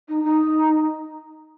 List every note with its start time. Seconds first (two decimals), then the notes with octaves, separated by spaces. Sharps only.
0.09 D#4
0.24 D#4